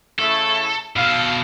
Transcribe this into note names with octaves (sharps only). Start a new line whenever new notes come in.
C#3 A3 E4 A4
B2 A4 F5